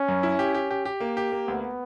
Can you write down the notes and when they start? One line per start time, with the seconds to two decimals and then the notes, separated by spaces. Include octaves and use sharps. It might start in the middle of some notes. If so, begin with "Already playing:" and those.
Already playing: C#4
0.08 F#2
0.23 E4
0.39 G4
0.54 G4
0.70 G4
0.85 G4
1.00 A#3
1.17 G4
1.32 A#3
1.47 D2 B3